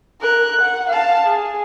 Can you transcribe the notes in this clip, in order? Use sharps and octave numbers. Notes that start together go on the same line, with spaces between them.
A#4 F#6
F#5
F5 A5
G#4